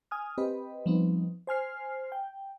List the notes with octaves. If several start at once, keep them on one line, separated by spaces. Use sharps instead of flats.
G#5 D#6 F6
C4 G4 B4 D#5 B5
F3 G3 B3 C4 D#4
C5 G#5 F6 C7
G5